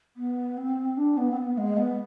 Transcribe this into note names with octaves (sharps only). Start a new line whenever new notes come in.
B3
C4
D4
B3
C4
B3
G#3
B3